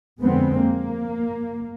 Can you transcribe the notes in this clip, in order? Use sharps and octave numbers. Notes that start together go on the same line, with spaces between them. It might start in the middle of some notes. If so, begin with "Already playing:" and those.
F2 D3 G#3 B3 C4
A#3